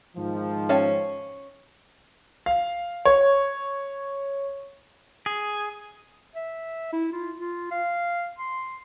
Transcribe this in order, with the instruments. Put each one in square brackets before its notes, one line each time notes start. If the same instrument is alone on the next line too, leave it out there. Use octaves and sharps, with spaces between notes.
[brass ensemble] G#2 D#3 F3
[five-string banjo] C#4 F5 A5
[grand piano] F5
C#5
[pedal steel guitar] G#4
[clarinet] E5
E4
F4
F4
F5
C6